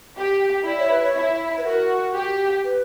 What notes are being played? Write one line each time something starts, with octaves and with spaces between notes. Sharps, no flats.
G4
E4 D5
C#5
B4
C#5
E4
B4
F#4 A#4
G4
B4